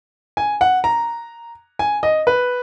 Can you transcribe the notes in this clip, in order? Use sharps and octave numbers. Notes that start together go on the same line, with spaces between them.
G#5
F#5
A#5
G#5
D#5
B4